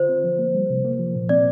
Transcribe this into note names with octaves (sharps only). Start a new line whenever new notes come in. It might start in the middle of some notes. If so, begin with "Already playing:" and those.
Already playing: D3 F4 C5
C4
F3
A#3
G3
C3
A#3
F3
A#2
C4 D5